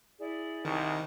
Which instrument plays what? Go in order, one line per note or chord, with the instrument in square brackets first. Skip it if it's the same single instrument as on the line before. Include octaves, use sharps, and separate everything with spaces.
[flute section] E4 G#4 D5
[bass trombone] C2 [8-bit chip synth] D#3